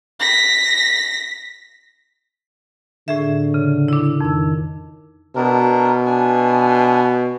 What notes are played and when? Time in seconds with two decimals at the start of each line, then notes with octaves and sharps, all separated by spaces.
0.20 A#6 B6
3.08 A2 D3 G#4 E5
3.54 C#3
3.88 D4 E4
4.20 F2 D#3 E6
5.35 B2 D4 A#4
6.06 D4 G#5